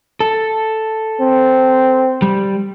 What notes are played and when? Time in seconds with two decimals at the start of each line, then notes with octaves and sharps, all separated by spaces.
0.20 A4
1.20 C4
2.22 G3